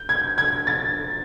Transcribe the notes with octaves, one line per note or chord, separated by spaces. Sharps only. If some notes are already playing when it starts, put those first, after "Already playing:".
Already playing: G6
G#6
G#6
A6